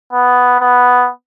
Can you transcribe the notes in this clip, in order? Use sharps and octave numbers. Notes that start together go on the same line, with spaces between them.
B3
B3